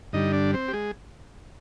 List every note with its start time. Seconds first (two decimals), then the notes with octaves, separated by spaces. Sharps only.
0.13 G2 D3 G3 D#4 D#5
0.33 D4 D5
0.53 C4 C5
0.68 G4
0.73 G#3 G#4